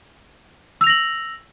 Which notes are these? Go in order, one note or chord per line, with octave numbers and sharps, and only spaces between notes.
E6 A#6 F7 F#7